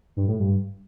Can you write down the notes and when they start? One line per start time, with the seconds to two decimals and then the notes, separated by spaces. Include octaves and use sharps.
0.17 G2
0.28 A2
0.39 G2